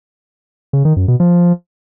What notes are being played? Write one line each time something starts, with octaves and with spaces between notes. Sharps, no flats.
C#3
D#3
F#2
B2
F3